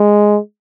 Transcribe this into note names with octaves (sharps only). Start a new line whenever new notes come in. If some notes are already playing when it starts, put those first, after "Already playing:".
Already playing: G#3